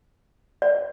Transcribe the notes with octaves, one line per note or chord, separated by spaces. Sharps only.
D5